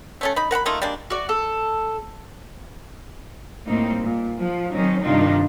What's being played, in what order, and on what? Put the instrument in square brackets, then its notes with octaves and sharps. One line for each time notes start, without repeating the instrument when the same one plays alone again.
[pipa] A3 C#4 A4
D#4 B5
A#4 F#5 A5 B5
A3 A#3 D#4 F4
G3 G#3 A#3 D4
[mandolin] F#4 D5
A4
[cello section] A2 G3 A#3 C4 D#4
A#2
F3
D#3 F#3 C4 C#4 D#4
G2 C3 D#3 D4 D#4 F4